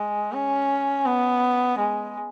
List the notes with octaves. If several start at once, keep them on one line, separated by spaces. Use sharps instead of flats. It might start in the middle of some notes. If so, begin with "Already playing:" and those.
Already playing: G#3
C#4
B3
G#3